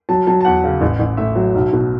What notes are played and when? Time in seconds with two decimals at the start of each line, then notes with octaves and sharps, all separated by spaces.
0.09 F#3 A5
0.27 F#3 A5
0.41 A5
0.45 E2 F#5
0.64 C#3
0.81 A1
0.99 A1
1.17 A2 E5
1.35 F#3
1.55 B1
1.73 B2